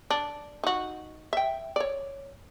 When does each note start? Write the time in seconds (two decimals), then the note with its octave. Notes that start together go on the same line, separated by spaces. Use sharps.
0.11 D4
0.64 D#4 F#4
1.33 E5 G5
1.76 C#5 D5